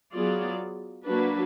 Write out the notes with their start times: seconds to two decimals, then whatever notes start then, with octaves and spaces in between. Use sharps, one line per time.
0.13 F#3 B3 F4 G#4 D5
1.07 F#3 A#3 D4 F#4 B4